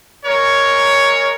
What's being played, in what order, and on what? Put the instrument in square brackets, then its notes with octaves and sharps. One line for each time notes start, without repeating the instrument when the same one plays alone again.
[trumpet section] G#3 A#4 C#5